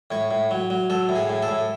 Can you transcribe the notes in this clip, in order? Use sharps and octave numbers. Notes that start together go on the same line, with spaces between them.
A2 C#5
A2
F#3
F#3
F#3 A4
A2
G#4
A2
A4
A2